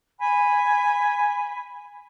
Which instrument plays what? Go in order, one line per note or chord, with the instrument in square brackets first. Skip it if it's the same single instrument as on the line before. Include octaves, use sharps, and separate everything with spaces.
[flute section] G#5 B5